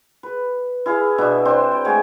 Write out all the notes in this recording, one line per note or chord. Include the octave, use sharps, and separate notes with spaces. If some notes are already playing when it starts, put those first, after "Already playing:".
B4
E4 G#4 F5
B2 D4 E5 B5
C4 D4 C5 C6
G5
G#3 A3 F#5 G#5